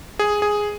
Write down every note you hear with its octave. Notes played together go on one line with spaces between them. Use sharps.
G#4
G#4